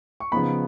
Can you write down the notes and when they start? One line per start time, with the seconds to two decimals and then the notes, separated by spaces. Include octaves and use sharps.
0.20 C#6
0.32 C#3 F3 B3 D#4 B5